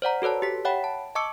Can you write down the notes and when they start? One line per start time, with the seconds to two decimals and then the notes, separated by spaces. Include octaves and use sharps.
0.02 C5 D5 F#5 A#5
0.22 F#4 A4 B4 C#5 A5
0.42 G4 B6
0.65 C#5 E5 F#5 G5 B5
0.84 A5
1.15 D#5 A5 C#6 D6 E6 C#7